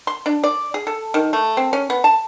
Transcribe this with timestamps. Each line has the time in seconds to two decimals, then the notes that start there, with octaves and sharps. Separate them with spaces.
0.07 C6
0.26 D4
0.44 D5
0.74 G#4
0.87 A4
1.14 D#3
1.33 A3
1.57 C4
1.73 C#4
1.90 B3
2.04 A5